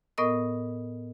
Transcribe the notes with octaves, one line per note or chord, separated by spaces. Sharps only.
A2 B3 A#4 D#5 D#6